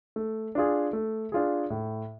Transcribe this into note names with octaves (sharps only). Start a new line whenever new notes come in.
A3
D4 F4 G#4
A3
D4 F4 G#4
A2